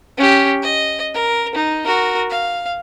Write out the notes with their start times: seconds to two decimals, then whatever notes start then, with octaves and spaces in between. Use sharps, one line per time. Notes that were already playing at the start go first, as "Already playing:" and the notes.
0.18 C#4 G4
0.62 D#5
1.14 A#4
1.55 D#4
1.86 F#4 A#4
2.30 F5